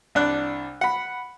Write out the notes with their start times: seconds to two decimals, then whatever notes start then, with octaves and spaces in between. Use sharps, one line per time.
0.15 C2 D4 F#6
0.81 F#5 B5